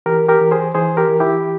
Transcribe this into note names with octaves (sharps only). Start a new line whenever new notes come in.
E3 G4 A#4
G4 A#4
E3
G#4 C5
E3 G#4 C5
G4 A#4
E3
E4 G4